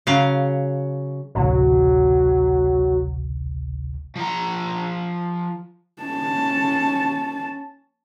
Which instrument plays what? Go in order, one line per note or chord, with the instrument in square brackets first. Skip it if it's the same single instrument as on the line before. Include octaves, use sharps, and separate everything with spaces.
[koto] C#3 F#3 F5
[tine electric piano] A1 D2 C3 [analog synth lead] F#3
[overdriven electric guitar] F3 A#5
[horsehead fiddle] C#4 A5